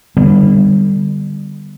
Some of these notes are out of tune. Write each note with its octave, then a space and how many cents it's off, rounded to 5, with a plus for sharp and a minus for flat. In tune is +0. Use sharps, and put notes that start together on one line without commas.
D3 +30 G3 +10 B3 +0